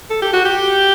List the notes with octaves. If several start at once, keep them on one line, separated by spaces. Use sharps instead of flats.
A4
G4
F#4
G4